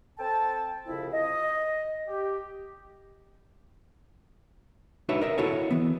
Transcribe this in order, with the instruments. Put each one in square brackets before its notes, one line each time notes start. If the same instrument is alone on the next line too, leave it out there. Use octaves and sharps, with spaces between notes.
[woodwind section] C4 A4 G5 A5
C2 F2 C#3 E4
D#5
G4
[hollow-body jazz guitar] D4 D#4 F#4 B4 C#5 E5
A#4 D#5 E5
E4 F#4 A4 C#5 G#5
E3 B3